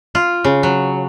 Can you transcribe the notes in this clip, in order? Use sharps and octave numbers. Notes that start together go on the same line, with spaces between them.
F4
C#3
F#3